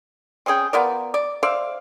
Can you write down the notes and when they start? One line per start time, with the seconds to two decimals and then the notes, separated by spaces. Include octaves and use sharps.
0.46 C4 C#4 G#4 G5
0.73 B3 F4 A#4 D5
1.14 D5
1.43 C5 D5 E5 F5